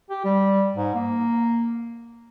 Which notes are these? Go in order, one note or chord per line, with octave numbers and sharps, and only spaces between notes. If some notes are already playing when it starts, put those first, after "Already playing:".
G4
G3
G#2
A#3